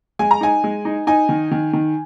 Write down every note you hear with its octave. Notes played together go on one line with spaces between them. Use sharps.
G#3 G#5
A#5
D#4 G#5
G#3
D#4
D#4 G#5
D#3
D#3
D#3